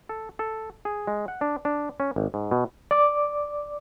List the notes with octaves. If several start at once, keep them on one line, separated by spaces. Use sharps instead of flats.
A4
A4
G#4
G#3
F#5
D4
D4
C#4
G#1
G#2
B2
D5 D6